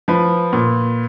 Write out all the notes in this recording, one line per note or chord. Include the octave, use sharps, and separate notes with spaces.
F3 B4
A#2